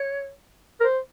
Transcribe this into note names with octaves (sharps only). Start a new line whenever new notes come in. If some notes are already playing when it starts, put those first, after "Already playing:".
Already playing: C#5
A#4
C5